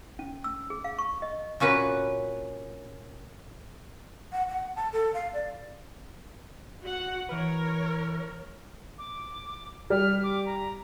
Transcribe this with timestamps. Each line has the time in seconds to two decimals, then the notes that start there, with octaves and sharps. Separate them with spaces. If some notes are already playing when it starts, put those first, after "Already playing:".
0.19 C#4
0.44 E6
0.70 G#4
0.84 F5
0.99 C#6
1.22 D#5
1.60 A#2 C#4 F#4 B4
4.32 F#5
4.49 F#5
4.76 A5
4.92 A4
5.14 F5
5.33 D5
6.81 F#4 F#5
7.29 E3 A#4 B4 C#5
8.98 D6
9.90 G3 F6
10.23 D6
10.46 A#5